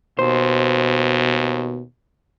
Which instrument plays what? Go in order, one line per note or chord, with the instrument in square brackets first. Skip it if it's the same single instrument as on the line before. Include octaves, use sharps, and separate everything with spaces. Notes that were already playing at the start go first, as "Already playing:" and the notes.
[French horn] D#2 [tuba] B2 [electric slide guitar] C5